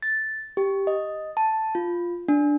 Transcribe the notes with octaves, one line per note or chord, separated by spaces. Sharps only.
A6
G4
D#5
A5
F4
D4